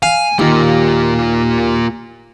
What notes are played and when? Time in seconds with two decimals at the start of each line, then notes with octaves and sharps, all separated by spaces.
0.03 F5 G#5
0.39 D#2 A#3 F4